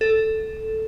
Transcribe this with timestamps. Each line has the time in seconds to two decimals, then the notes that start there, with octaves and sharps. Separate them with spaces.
0.01 A4